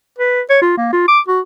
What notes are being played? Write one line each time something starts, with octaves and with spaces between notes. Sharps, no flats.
B4
C#5
F4
A#3
F4
D6
F#4